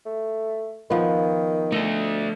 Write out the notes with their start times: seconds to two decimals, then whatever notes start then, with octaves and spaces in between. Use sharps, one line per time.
0.06 A3
0.90 D#3 F3 B3
1.72 A3 D4 D#5